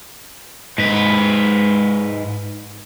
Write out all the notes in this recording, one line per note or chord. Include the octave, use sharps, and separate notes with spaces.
G#2 B4